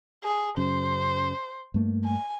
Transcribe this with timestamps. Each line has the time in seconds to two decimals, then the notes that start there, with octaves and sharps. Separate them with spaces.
0.24 G#4
0.57 F#2 C#3 C5
1.74 G2 A3 A#3
2.04 G#5